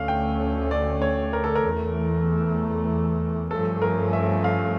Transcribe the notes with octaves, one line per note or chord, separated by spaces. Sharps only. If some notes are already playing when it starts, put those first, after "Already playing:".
Already playing: D2 D3 A3 C#4 F5
G5
D5
C#5
A#4
A4
A#4
E2 E3 A3
G2 F3 A3 C#4 A4
A#4
E5
F5